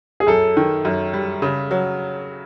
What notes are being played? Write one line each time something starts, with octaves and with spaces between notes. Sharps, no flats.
G#4
F#2 A4
D#3
F#2
G3
C#3
F#3